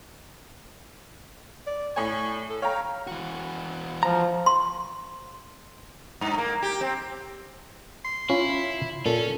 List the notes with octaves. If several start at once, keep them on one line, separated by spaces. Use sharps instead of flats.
D5
A2 C#5 G#5
A4
C#5 F5 G5 A#5
E3 F#4
F3 A#5
C6
G2
A#3
G4
C4
C6
C#4 E4 F4
A#2 C#4 A4